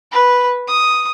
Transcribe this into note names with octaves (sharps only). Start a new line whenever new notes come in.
B4
D#6